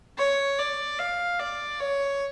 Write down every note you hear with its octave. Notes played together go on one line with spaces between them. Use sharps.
C#5
D5
F5
D5
C#5